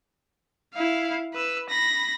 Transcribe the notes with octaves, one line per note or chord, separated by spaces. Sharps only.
E4 F5
B4 E6
B5 A#6